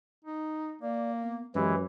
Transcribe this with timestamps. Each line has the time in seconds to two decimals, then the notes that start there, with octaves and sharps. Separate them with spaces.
0.25 D#4
0.82 A#3 D5
1.23 B3
1.55 F#2 E3 G#3 G4